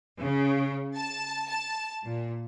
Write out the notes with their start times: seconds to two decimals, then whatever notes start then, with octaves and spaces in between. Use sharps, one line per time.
0.20 C#3
0.96 A5
1.49 A5
2.06 A#2